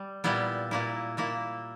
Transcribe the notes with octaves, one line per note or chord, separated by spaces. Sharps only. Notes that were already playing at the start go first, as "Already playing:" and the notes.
Already playing: G3
A#2 G3 B3 E4
A#2 A#3 E4
A#2 A#3 E4